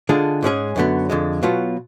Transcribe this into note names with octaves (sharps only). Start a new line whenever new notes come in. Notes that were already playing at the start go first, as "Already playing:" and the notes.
D3 G#3 D4 F4 G#4
G#2 G#3 C#4 G#4
F#2 D3 F#3 B3
F2 D3 G#3
B2 F#3 B3 F4